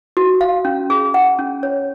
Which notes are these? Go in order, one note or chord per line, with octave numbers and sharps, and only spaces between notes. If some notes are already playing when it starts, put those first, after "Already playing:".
F#4
F5
C#4
G#4
F#5
C#4
C#5